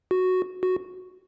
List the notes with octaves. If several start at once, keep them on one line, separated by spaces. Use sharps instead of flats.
F#4
F#4